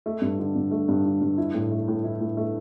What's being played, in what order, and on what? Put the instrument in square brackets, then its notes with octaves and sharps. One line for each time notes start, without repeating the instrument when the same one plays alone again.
[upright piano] A3
G2
D3
G2
A3
G2
D3
G2
E4
A2
A3
A2
E4
A2
A3